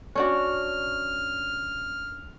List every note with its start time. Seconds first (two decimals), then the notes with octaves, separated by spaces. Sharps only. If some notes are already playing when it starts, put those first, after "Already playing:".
0.15 C#4 D4 F#4 F6